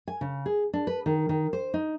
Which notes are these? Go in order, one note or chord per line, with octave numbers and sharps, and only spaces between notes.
G#5
C#3
G#4
D4
B4
D#3
D#3
C5
D#4